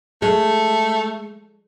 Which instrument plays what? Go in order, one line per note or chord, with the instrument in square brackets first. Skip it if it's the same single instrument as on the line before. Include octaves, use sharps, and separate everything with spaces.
[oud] G#3 [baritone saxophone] A3